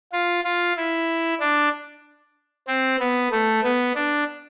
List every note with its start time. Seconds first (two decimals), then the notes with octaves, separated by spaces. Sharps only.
0.12 F4
0.44 F4
0.77 E4
1.40 D4
2.68 C4
2.99 B3
3.31 A3
3.63 B3
3.95 D4